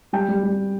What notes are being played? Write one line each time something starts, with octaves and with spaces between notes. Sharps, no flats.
G3 G5
G3
G3